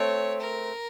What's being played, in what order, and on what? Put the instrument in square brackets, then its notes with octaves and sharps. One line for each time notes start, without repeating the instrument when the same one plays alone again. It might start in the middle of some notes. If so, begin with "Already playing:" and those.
Already playing: [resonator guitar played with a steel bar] A3 C4 [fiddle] C#5
[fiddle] A#4